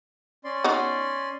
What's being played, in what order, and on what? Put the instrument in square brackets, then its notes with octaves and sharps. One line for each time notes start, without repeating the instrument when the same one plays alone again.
[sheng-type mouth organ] C#4 D5 C6
[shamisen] B3 D#4 F#4